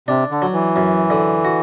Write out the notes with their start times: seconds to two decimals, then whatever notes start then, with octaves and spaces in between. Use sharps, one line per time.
0.08 C3 D4
0.31 D3
0.42 F#3
0.53 E3
0.76 F#2
1.10 D3
1.45 F#4